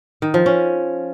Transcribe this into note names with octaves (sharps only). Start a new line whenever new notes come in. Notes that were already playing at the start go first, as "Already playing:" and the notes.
D#3
F3
C#4